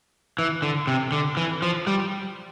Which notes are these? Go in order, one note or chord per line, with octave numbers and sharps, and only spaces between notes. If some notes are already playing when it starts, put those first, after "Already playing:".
E3
D3
C3
D3
E3
F3
G3